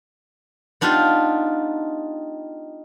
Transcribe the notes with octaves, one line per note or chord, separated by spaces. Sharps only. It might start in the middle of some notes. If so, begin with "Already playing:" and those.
B3 D4 D#4 F4 G4